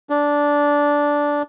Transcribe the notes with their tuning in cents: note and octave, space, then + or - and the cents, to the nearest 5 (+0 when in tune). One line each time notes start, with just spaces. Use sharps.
D4 -10